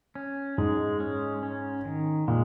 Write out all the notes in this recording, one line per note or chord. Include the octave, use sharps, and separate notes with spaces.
C#4
G#2 G#3
C#4
C#4
D#3
A#2 G#3